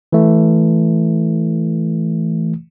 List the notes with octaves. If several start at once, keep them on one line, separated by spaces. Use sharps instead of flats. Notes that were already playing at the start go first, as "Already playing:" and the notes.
E3 A3